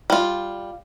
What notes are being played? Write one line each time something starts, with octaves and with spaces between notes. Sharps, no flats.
G3 F4